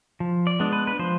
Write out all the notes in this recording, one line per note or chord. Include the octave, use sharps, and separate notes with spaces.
F3
D5
G#3 B3 D4
B4
B4
F3 C5